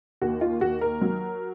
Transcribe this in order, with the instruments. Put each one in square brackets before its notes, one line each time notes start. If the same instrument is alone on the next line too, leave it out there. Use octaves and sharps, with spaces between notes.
[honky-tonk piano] D#2 F#4
F4
D#2 F#4
A#4
F#3